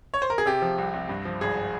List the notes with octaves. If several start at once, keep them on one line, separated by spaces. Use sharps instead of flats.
C#5
C5
A#4
G#4
C3 G4
F3
C2
C2
G2
F3
G#1 G#4